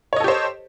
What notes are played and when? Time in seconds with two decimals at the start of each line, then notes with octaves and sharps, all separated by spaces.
0.13 C#5
0.16 D#5
0.20 A4
0.24 G4
0.28 C5